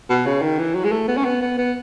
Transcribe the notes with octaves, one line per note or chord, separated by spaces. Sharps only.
B2
C#3
D#3
E3
F#3
G#3
A3
B3
C#4
B3
B3
B3